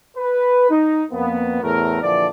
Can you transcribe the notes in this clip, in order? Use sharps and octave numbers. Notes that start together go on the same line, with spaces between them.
B4
D#4
F2 A#3 B3
E2 A2 A3 A#4
A#1 D3 E3 F3 D4 D5